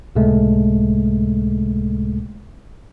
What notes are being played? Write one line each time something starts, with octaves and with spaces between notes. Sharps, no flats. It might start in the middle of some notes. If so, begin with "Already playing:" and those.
C#2 A2 C3 G#3 A3